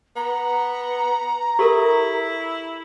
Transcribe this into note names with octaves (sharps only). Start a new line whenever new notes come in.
B3 A#5
E4 G4 A4 A#4